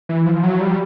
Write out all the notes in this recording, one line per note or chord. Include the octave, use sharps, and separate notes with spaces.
E3
F3
F#3
G3